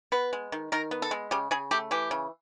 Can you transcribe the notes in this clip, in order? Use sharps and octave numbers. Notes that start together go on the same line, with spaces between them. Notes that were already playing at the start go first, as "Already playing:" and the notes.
B3 B4
G#3
D#3
D#3 A#4
B3
A4
G#3
C#3 G4
C#3 G#4
A3 G4
E3 G4
C#3